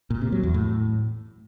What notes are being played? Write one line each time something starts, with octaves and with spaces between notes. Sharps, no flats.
A#2
C3
F#3
E2
A2